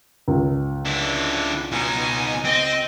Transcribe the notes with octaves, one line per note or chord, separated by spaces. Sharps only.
C#2
D3 E4
B2 D#4 G#5
C4 D#5